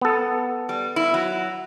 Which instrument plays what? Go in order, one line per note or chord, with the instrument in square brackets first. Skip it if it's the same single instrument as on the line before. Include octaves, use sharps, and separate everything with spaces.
[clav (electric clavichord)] B3 A4
[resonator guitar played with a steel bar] G3
E4
F#3